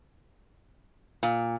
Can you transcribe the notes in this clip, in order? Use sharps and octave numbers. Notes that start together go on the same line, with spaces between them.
A#2